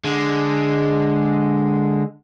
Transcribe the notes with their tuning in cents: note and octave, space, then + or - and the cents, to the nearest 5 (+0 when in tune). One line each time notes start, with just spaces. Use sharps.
D3 +0 G#3 +0